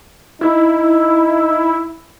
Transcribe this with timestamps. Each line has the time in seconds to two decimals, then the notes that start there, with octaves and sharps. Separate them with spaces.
0.41 D#4 E4